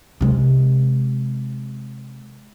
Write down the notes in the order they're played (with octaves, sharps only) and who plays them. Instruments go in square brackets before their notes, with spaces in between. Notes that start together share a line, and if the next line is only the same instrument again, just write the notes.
[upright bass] C3 G#3